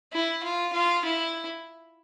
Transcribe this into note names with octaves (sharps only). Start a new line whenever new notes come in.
E4
F4
F4
E4